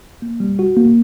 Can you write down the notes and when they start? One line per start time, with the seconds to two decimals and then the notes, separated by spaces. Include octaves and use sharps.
0.22 A#3
0.40 G3
0.59 F#4
0.76 A#3